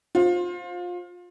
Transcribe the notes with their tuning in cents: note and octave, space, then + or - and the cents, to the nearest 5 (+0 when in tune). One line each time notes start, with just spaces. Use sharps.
F4 +25 C5 +10